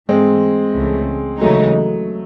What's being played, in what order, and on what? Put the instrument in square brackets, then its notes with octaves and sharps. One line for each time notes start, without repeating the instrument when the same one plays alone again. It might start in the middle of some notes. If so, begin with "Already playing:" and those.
[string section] G#2 E3 A3 [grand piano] G#3 C4
[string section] C#2 C#3 E3 A3
[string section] D#2 C#3 E3 G#3 D#4 [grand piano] F#3 A3